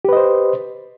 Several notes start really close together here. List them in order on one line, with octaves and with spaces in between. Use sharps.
G4 B4 D#5 C5